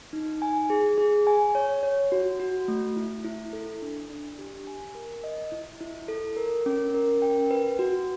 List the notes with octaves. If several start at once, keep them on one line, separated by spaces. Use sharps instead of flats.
D#4
G#5
G#4
G#4
G#5
C#5
C#5
F#4
F#4
A3
E4
E4
A4
D4
D4
G4
G#5
A#4
D#5
E4
E4
A4
A#4
C#4
A#4
G5
B4
F#4